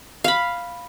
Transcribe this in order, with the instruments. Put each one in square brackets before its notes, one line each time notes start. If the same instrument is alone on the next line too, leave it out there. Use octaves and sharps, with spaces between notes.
[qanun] F5 B5